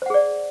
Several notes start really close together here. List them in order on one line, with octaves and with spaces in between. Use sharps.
C5 F#5 G#4 D5